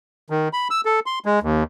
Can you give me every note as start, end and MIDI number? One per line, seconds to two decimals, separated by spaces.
0.30 0.48 51
0.53 0.68 83
0.71 0.81 88
0.85 1.00 69
1.06 1.19 84
1.25 1.39 56
1.42 1.64 39